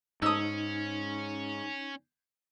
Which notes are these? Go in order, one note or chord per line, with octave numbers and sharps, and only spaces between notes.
G#2 C#4 D#4 D#6 E6